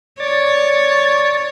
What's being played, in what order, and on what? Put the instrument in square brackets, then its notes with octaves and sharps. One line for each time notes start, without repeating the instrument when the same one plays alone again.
[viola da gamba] C#5 [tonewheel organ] D5 A6